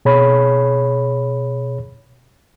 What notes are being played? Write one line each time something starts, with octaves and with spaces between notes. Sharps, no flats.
B2 G#4 C#5 B5